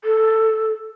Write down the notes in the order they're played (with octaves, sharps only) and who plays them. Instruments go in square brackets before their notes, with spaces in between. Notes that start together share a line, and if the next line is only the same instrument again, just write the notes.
[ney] A4